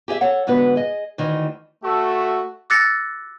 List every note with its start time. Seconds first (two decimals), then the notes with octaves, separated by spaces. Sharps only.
0.08 G4 G#4 D#5 E5
0.21 A4 C#5 F#5
0.47 G#2 D3 B3 F#4 B4
0.76 G#4 D#5
1.18 D2 D#3 E3
1.84 A3 F#4
2.70 D6 E6 F#6 A6 A#6 C#7